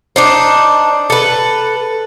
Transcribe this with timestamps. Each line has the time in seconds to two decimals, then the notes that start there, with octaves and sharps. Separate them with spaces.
0.16 D4 D#4 C5
1.10 A4 B4